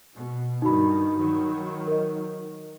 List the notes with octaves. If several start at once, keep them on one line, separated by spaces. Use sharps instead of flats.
B2
G2 D#3 D#4 F#4 B5
D#3 F#3
A#4 D#5